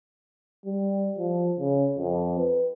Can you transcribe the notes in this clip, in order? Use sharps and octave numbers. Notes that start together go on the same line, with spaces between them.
G3
F3
C#3
F2
B4